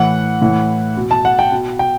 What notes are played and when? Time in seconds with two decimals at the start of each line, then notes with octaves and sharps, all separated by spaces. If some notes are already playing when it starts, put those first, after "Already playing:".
Already playing: A2 E3 F#5
0.42 A2 E3
0.97 B2
1.11 A5
1.25 F#5
1.39 G5
1.52 B2
1.79 G5